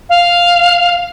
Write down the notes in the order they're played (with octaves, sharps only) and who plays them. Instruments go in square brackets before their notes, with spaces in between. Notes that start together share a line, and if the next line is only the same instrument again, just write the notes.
[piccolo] F5